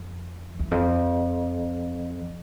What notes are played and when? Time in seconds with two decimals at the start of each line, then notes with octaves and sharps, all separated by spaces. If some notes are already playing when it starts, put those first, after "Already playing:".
Already playing: F2
0.59 E2
0.71 F2